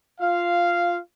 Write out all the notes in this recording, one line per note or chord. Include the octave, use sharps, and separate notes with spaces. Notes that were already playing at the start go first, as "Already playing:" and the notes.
F4 F5